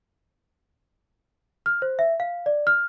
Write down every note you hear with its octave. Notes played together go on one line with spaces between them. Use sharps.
F6
C5
E5
F5
D5
F6